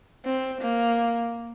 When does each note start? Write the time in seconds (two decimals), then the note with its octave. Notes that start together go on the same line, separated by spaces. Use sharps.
0.25 C4
0.62 A#3